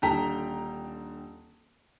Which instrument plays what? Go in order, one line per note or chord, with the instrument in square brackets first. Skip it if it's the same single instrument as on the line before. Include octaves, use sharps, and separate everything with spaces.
[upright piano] D#1 D3 G5 A#5 B6